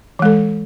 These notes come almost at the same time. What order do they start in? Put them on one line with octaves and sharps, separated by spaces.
E3 G#3 A4